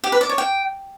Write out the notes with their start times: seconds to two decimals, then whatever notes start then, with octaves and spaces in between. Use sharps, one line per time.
0.04 G4
0.12 B4
0.21 D5
0.29 C#5
0.38 G5